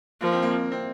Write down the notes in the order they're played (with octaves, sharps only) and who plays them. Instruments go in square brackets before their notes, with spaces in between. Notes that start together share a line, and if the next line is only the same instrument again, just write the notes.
[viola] F3 [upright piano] A#3
[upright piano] C4
A#3
C4